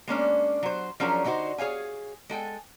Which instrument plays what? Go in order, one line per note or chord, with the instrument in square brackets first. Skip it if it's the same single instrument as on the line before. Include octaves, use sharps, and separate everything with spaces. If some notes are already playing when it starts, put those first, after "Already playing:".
[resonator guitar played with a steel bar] G#3 A#3 C#4 D4
F#3 C5
F3 F#3 C#4 D4 G#4 A#4
D3 D4 D#4 F#4 C5
G#4 C#5 F5 G#5
G#3 A4 G5 G#5